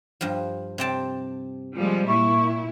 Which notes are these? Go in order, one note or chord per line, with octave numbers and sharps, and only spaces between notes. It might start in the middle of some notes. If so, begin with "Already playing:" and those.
G2 F3
C3 G5 A5
F3 G3 G#3
A#2 E4 C#6